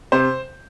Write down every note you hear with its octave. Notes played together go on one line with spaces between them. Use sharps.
C3 C5